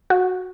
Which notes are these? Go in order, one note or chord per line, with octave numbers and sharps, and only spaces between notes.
F#4